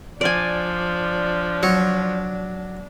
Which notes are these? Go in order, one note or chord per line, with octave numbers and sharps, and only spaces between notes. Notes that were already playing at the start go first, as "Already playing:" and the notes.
F3 D4 D5 G#5
F#3 C#6